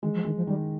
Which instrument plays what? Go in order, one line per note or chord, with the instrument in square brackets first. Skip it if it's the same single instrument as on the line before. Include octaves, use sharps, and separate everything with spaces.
[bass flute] D#3 [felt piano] G#3
[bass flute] F3
[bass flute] D#3 [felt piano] G#3
[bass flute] F3
[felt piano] D#3 [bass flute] G3